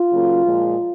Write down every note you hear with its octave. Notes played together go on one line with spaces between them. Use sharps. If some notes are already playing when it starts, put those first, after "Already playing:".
Already playing: F4
C#3 F#3 A#3
A#2 F3 G#3